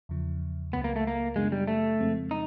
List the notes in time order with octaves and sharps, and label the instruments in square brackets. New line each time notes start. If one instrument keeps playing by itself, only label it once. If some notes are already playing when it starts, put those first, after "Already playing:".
[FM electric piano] E2 C#3 F3
[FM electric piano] C#2 C#3 F#3 [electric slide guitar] B3
[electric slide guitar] A#3
A3
A#3
[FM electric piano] F#2 C#3 F#3 B3 D4 [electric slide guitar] G#3
[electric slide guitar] G3
A3
[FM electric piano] F2 C#3 F3 G#3 C4
[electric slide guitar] D#4